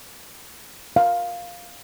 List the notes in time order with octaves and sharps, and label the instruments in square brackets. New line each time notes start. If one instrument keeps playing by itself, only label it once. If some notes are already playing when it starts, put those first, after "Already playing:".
[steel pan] F5